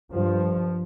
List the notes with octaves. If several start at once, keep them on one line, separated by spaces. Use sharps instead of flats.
G2 F3